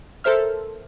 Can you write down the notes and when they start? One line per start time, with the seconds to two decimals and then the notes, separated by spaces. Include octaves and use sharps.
0.24 A4 A#4 C5 E5 F6